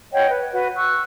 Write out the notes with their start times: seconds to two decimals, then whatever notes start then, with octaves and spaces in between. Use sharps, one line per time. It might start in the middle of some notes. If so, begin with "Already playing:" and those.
0.13 C#5 D#5 F#5 G5
0.30 B4
0.52 F#4 B4
0.76 C#6 E6 F#6